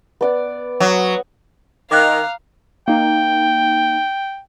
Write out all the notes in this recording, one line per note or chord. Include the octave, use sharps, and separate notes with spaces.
B3 D5 F#5
F#3 D#6
D#3 F5 A#5 D6 F#6
A#3 D#4 G5